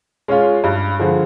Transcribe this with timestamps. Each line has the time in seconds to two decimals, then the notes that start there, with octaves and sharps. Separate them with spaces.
0.28 G#3 C#4 F4
0.64 G2
0.99 D3 F3 G#3